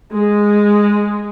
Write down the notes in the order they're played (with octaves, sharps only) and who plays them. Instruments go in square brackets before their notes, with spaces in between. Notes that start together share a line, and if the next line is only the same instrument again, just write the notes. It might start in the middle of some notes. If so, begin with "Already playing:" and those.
[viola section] G#3